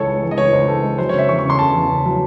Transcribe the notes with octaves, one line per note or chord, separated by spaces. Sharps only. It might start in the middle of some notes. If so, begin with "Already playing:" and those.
Already playing: C#2 E3 A4 C#5
G#3
E3
D#5
C#2 C#5
C#2 C5
E3 A4
G#3
F#3 C5
C#5
C#3 E5
E2 C#6
C#6
C#3
C6
C#3 A5
E2
C#3
F#3